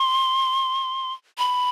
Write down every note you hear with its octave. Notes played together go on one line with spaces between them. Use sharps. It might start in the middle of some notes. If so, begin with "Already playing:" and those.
Already playing: C6
B5